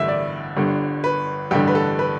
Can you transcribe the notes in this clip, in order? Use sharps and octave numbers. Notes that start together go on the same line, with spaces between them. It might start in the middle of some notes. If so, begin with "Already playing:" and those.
Already playing: A1 G2 D3 E5
D5
G1 G2 D3
B4
A1 G2 D3 G4
B4
A4
B4